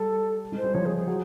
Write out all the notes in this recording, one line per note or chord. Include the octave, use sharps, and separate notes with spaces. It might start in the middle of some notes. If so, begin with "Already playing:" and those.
Already playing: G3 A4
G#3
C5
G3
F3 C#5
G#4
G#4
F#3